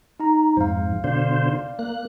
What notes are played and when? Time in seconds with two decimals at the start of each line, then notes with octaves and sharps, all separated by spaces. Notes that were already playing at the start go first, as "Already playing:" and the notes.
0.20 D#4 A#5
0.57 F2 G#2 C5 F5
1.04 B2 D3 C5 D5 F5
1.79 A#3 F#6